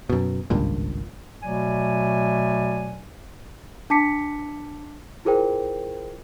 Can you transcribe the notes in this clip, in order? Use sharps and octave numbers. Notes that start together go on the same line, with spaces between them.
F#2 B2
G#1 C#2 G2 A#2
B2 F#3 A3 D5 G#5
D4 A5 D6 B6 C#7
E4 F4 G#4 A#4 C5 G5